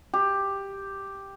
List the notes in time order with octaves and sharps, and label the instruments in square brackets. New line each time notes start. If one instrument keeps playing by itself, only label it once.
[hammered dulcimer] G4